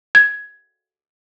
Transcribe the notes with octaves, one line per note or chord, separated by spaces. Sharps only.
G#6